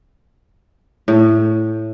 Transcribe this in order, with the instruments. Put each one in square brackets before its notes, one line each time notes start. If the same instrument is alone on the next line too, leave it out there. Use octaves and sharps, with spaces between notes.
[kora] A2